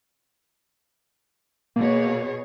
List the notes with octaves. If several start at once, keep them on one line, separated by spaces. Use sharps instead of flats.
B2 A#3 G#4 C#5